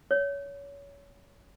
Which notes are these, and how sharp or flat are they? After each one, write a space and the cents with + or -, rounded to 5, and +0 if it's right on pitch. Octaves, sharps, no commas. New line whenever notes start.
C#5 +25